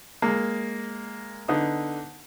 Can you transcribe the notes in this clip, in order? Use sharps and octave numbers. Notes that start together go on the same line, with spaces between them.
G#3 A#3
D3 B3 D#4 D#6